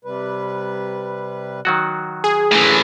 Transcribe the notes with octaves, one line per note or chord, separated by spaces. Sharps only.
C3 G3 B4
D#3 F#3 F#4
G#4
F#2 A2 D3 E3